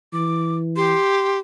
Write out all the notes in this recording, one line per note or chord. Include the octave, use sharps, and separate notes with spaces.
E3 D6
G4 C6